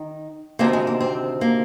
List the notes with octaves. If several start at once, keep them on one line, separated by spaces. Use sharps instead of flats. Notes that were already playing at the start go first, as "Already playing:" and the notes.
Already playing: D#3
D2 C3 D#3 A#3
G#3
A#3
C4
A#3